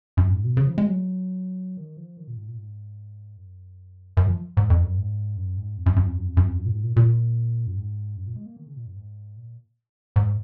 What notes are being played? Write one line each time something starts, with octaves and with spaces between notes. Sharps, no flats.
F#2
G#2
B2
C#3
F3
G#3
F#3
D#3
F3
D#3
A#2
G#2
A#2
G#2
F#2
F#2
F3
G#2
F2
F#2
G#2
F#2
G#2
F2
F#2
F#2
F2
F#2
F2
F#2
F2
F#2
A#2
G#2
A#2
A#2
F#2
G#2
F#2
A#2
G#3
A#3
D#3
C#3
A#2
F#2
G#2
A#2
G#2